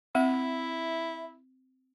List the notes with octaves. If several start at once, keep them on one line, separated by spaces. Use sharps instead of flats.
C4 E4 E5